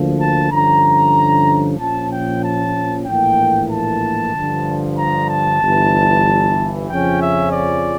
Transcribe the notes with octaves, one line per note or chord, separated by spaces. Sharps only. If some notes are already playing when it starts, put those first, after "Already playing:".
Already playing: D2 D3 F3 A#3
A5
G2 D3 F3 C#4 A#5
A#1 A#2 F3 C#4 A5
G5
A5
A#1 A2 E3 A#3 G5
A5
G2 D3 F3
A#5
A5
G1 G2 E3
F2 C#3 F3 C#4 G5
E5
D5